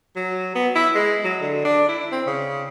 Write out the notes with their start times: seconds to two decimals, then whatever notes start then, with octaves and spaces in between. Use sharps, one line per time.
0.16 F#3
0.55 B3
0.76 E4
0.95 G#3
1.24 F#3
1.42 D3
1.65 D4
1.89 E4
2.12 C4
2.27 C#3